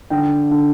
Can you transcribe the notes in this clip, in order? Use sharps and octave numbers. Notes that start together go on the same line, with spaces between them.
D3 G5
D3